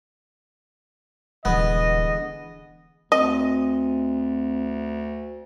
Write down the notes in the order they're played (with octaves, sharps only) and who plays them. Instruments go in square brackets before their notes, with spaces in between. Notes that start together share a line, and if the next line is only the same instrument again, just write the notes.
[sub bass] D#1 [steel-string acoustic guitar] D3 E3 G#3 [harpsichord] B3 [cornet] D#5
[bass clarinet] D2 [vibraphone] C4 [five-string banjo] D#5